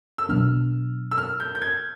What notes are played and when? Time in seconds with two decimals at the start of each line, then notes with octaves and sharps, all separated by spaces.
0.18 E6
0.29 B2 F#3 B3 D4 F6
1.11 E6
1.18 F6
1.40 G6
1.55 G6
1.62 G#6